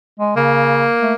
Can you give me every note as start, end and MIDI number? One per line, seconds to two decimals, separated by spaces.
0.20 0.34 56
0.36 0.88 49
0.36 1.15 58
1.01 1.13 57